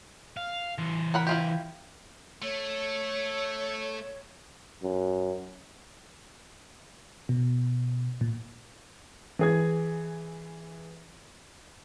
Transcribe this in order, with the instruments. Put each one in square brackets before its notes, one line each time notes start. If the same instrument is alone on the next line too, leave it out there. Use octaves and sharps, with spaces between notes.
[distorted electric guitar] F5
E3 C5
[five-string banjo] A#4 F#5 B5
E4 F4 G4
[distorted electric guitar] A3 [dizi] C#5
[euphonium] F#2
[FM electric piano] B2
A#2
[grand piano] E3 G#4 G#6